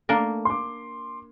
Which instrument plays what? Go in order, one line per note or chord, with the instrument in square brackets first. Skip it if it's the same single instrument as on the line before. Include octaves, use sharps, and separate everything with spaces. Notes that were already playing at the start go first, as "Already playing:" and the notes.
[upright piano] A3 [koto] A#3 D4 A#4
[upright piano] C6 D6